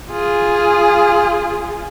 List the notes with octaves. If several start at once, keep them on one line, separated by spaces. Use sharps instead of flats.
F4 G#4